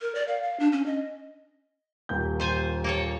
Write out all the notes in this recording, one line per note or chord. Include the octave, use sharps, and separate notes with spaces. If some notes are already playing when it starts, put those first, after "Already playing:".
A#4
D5
F5
F5
D4
C#4
D#5
D#1 D#2 G6
F4 C5 G#5
A#3 A4 C#5